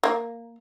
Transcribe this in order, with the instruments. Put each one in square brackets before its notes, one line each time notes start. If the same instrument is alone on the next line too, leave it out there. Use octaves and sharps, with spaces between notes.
[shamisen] A#3